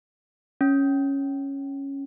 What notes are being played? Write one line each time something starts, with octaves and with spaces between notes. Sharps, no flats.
C#4